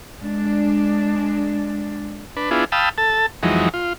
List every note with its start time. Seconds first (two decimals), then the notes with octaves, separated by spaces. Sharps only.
0.19 G#3 D4
2.37 D4 B4
2.51 B3 D4 E4 F4 G#4
2.72 F5 G5 A5 B5 D#6 E6
2.98 A4 A5
3.43 F2 E3 F#3 G#3 D#4
3.74 F4